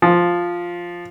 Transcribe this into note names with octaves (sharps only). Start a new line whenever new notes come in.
F3